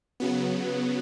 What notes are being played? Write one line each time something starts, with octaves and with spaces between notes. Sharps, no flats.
C#3 F#3 B3